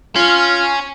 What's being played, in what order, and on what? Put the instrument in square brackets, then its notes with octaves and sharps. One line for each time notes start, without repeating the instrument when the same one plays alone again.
[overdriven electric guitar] C#4 [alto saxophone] F4